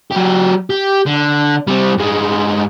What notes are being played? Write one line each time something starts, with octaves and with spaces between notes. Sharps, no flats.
F#3 G4
G4
D3
G3 C4
G2 G#3